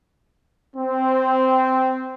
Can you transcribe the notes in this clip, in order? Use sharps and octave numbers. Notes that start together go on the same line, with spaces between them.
C4